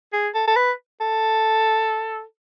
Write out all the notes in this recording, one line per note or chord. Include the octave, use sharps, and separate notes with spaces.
G#4
A4
A4
B4
A4